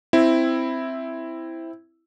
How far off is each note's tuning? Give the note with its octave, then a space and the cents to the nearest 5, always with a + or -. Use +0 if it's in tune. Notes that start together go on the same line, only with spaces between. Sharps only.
C4 +0 E4 +0